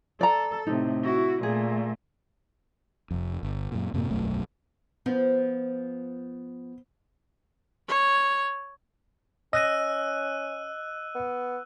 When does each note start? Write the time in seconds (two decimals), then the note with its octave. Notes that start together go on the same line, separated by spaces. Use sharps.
0.21 A4 D5 A#5
0.67 A2 C3 D#4
1.03 E4 F#4
1.43 A#2 A3 G#4
3.11 F1 F2
3.43 G1
3.72 F#2 A#2
3.94 F#2 A2 C3 A#3
4.11 E1 B1 F#2 A3
5.06 F3 B3
7.88 C#5
9.53 C#4 D#5 E6 F#6 A#6 D#7
11.15 B3